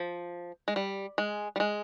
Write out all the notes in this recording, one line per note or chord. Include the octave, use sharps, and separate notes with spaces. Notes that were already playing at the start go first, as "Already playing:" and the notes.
Already playing: F3
G#3
G3
G#3
G3
G#3